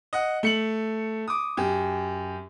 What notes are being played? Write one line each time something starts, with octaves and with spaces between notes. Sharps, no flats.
D#5 F#5
A3 C#7 F#7
D6 D#6
F#2 G4